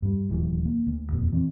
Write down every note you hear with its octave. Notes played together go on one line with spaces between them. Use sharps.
G2 G3
D#1 D2 E3 F#3
A#3
D2
D#1 F2 A#2
E3 C4